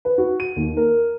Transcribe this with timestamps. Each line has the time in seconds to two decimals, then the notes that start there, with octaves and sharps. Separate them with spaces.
0.05 B4
0.18 F#4
0.40 D#7
0.56 D#2
0.77 A#4